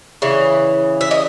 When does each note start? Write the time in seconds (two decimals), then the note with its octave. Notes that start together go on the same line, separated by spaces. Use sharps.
0.22 C#3 E3
1.01 E5
1.11 D#5